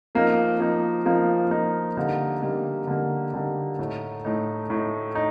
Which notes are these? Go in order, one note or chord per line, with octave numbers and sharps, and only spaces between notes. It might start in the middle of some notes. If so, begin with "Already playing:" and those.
F3 A#3 D#4
F3 A#3 D#4
F3 A#3 D#4
F3 A#3 D#4
D3 G3 A#3 D#4
D3 G3 A#3 D#4
D3 G3 A#3 D#4
D3 G3 A#3 D#4
A2 A3 D#4
A2 A3 D#4
A2 A3 D#4
D#4